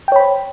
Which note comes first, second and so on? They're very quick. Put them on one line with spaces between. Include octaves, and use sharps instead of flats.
G5 C#5 B5 C5